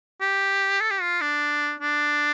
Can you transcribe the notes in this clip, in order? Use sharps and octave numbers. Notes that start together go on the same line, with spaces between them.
G4
A4
G4
F4
D4
D4